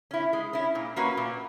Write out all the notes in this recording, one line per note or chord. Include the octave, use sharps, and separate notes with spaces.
C#4 E4
G#3
C#4 E4
A#2
A#3 C#4 F#4 B4
A#2